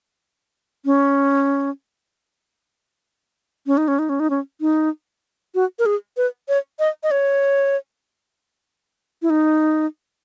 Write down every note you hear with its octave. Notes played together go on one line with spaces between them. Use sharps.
C#4
C#4
D#4
C#4
D#4
C#4
D#4
C#4
D#4
F#4
A#4
G#4
B4
C#5
D#5
D#5
C#5
E4
D#4